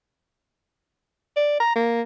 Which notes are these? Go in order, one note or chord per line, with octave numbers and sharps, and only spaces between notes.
D5
A#5
A#3